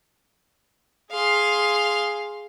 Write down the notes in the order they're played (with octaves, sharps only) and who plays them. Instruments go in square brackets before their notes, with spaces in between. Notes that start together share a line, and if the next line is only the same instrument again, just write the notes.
[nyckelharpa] G#4 [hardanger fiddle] F5 C6